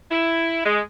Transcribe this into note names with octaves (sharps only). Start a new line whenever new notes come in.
E4
G#3